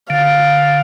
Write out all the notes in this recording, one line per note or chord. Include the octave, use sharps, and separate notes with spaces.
D3 F5